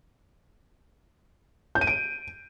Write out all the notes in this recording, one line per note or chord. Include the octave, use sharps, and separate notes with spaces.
G6
D#7
D7